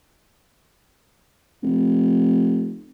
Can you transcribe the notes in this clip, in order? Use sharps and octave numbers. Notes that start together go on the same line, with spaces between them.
F1